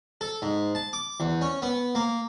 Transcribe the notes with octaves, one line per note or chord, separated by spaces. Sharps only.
A4
G#2
A5
D6
E2
C#4
B3
A#3